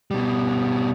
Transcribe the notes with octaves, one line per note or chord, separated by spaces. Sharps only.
B2 G3